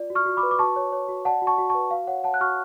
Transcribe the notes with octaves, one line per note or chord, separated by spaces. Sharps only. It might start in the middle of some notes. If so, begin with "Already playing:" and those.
Already playing: F4 D5
F#4
C#6 F6
F#4
B5 D6
B4
D6
F#4 A5 C#6
C#5
C#5
F#4
D5 F#5 A5
F#4
A5 C#6
F#4
A5 C#6
B4
F#4 F5
C#5 F#5
C#5 F#5 A5
F#6
F#4 C#6 F6